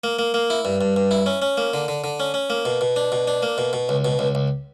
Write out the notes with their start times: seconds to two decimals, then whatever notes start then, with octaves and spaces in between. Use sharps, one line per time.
0.04 A#3
0.19 A#3
0.34 A#3
0.50 E4
0.65 G2
0.81 G2
0.96 G2
1.11 E4
1.26 C#4
1.42 C#4
1.57 A#3
1.74 D3
1.88 D3
2.04 D3
2.20 C#4
2.34 C#4
2.50 A#3
2.65 B2
2.81 B2
2.96 D4
3.12 B2
3.27 D4
3.42 A#3
3.58 B2
3.73 B2
3.89 C#2
4.05 B2
4.19 C#2
4.35 C#2